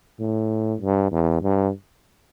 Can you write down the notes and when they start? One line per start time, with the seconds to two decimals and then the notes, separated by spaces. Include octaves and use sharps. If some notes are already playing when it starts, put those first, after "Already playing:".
0.19 A2
0.81 G2
1.12 E2
1.42 G2